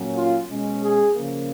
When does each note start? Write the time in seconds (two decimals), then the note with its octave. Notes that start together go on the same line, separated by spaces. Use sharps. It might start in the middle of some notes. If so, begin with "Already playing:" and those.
Already playing: A#2 F#3 A#3 C#4
0.16 F4
0.49 B2 G#3 C#4
0.82 G#4
1.14 C#3 F3 A#3